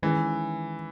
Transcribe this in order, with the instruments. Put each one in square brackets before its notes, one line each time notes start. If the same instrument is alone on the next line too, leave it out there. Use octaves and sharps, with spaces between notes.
[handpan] D#3 G#3 C#4 E4 [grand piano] E3